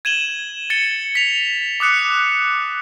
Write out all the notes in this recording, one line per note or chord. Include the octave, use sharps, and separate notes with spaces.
G#6 D#7 E7 F#7 G7
A6 C#7 G7
B6 F7
D6 D#6 F#6 C#7